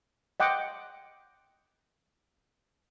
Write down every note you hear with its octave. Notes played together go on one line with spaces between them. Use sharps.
D#5 F#5 G5 D6